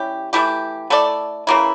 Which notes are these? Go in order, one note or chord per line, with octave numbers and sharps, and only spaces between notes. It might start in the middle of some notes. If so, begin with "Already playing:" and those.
Already playing: G3 C#4 E4 G4
E3 A3 E4 G4
A3 E4 A4 D5
C#3 E3 A#3 E4